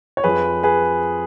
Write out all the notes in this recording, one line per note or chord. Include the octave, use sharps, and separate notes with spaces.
C#5
F2 F3 G#4 B4
G#4 B4